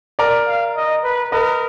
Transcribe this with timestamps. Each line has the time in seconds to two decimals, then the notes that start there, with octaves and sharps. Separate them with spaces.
0.19 A#4 D5
0.47 F5
0.76 D#5
1.04 B4
1.32 A#4 B4 D#5